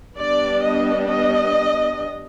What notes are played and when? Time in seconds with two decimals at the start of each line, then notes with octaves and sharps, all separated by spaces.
0.18 G3 B3 D4 D5
0.64 D#5
1.11 D#5